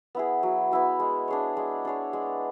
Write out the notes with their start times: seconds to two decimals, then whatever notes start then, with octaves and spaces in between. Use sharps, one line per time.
0.15 B3 E4 G#4
0.43 F#3
0.72 B3 E4 G#4
1.00 G#3
1.28 D4 G#4 C#5
1.57 G#3
1.85 D4 G#4 C#5
2.13 G#3